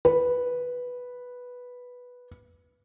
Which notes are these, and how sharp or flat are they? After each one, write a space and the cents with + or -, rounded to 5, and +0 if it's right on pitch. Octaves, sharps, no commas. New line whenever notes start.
B4 -5